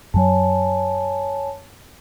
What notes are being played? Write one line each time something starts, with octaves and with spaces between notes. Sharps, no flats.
F#2 F#3 C#5 G#5 A5